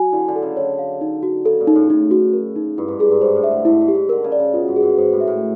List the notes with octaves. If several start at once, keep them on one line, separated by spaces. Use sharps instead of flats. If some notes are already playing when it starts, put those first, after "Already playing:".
Already playing: F#3 G#5
D3 E4
D3
A4
C#3
D3 C#5
F5
D#4
F#4
C#3 A4
A#2
D#4
A2
A2 D#4
F#4
A#4
D#4
G2 E4
G#2
G2 G#4
G2
G#2 C5
A2
E5
D3
G#2 E4
G#2
G4
G#2
D3 A#4
C#3
D5
C#3
B2 F4
G#2
G#4
G#2
G#2 C5
A2
E5
A2